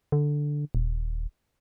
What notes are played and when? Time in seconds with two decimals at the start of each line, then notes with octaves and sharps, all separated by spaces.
0.12 D3
0.75 D#1